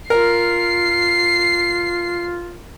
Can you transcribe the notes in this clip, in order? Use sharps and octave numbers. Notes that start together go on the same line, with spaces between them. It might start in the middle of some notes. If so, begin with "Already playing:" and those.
F4 A#4 C7